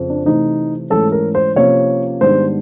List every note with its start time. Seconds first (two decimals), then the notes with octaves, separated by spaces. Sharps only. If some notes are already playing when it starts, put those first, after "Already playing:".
Already playing: F2 C#3
0.10 D4
0.25 C3 E3 A3 D#4
0.90 G#2 E3 A3 C#4 A4
1.12 A#4
1.35 C5
1.56 C3 F3 A#3 C#4 C#5
2.21 G#2 D#3 G3 B3 D4 C5